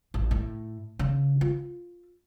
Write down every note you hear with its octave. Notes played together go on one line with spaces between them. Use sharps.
A1
A2
C#3
F4